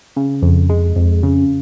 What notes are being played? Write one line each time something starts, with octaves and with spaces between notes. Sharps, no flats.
C#3
F2
G#3
F2
C#3